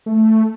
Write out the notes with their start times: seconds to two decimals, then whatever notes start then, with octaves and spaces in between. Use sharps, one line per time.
0.06 A3